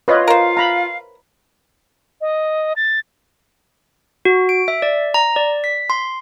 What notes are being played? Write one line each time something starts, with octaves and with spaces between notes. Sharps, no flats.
F4 B4 C#5 D#5
A#4 C5 F5
A#5 B5
D#5
A6
F#4
D7
E5
D5
A#5
D5
B6
C6